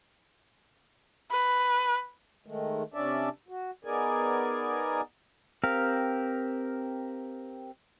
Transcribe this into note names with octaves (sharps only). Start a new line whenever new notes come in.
B4
D#3 G#3 A3
C3 C#4 D4 D5 E5 A5
F#4
B3 D#4 G#4 A#4 D5 G#5
C4 G4 A#4 F5